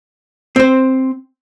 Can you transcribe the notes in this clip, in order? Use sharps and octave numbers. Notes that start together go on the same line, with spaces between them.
C4 C5